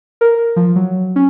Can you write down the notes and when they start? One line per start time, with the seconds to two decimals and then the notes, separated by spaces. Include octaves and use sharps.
0.21 A#4
0.56 F3
0.76 F#3
1.16 C#4